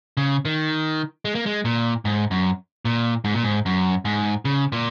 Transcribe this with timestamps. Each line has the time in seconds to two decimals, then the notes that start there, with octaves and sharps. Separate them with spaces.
0.17 C#3
0.45 D#3
1.25 G#3
1.35 A#3
1.46 G#3
1.65 A#2
2.05 G#2
2.31 F#2
2.85 A#2
3.25 G#2
3.35 A#2
3.44 G#2
3.66 F#2
4.05 G#2
4.45 C#3
4.72 A#2